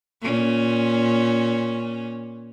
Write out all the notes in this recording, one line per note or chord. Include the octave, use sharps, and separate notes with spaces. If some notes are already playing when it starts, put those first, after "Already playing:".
A#2 C#4